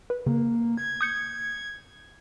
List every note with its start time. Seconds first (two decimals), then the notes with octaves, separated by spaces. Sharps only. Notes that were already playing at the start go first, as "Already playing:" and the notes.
0.10 B4
0.26 C#3 A#3
0.77 G#6
1.01 D#6 G6 C#7